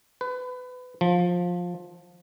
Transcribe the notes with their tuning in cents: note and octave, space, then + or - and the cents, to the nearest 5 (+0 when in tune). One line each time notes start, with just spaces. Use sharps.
B4 +25
F3 +15